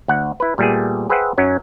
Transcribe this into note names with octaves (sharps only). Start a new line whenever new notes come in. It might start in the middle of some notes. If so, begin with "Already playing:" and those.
D2 F#5
E4 B4
A#2 G3 A3 B3 G#4
G#4 B4 C5 E5 F#5 G5
F#2 F#3 C#4 D#4